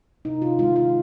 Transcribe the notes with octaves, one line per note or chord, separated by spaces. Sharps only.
C3 D#4
F4
D#3 G#3 F4
F4